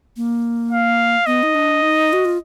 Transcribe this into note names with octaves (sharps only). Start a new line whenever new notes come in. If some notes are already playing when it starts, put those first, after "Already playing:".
A#3
F5
B3 D#5
D#4
D4
D#4
F#4
F4